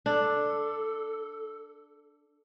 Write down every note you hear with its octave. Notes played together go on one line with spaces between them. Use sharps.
D4 A4